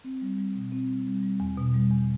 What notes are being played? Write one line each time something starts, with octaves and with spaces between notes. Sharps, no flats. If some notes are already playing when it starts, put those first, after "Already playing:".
C4
G3
G3
B2
C4
G3
G3
G3
E2
B2
G3
E2